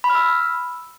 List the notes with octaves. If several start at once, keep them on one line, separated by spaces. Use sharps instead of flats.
B5
F6
E6